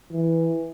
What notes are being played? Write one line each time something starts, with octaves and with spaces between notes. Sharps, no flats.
E3